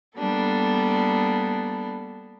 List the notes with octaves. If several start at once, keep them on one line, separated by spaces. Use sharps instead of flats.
G3 A#3 B3 D4 A4